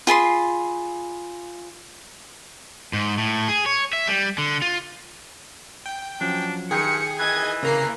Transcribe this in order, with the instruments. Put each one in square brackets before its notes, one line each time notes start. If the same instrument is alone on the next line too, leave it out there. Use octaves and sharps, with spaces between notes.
[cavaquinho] F4 G#4 B5 C6
[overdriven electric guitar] G#2
A2
G#4
C#5
E5
G3
D3
F4
[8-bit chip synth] G5
[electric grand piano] F3 F#3 C#4 [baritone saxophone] D4
[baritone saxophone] G2 [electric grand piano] D#3 G5 G6 [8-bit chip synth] G#4 [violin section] C#7
[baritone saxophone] E3 [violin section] D#5 G#6
[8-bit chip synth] C#3 A#5 C7 [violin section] A#3